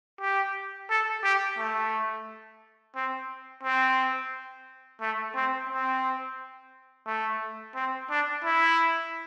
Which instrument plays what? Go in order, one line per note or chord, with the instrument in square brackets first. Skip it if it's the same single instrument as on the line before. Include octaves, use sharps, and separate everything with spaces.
[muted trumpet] G4
A4
G4
A3
C4
C4
A3
C4
C4
A3
C4
D4
E4